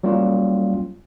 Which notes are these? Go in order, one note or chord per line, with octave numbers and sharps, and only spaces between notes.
F#3 G3 A#3 C#4 F4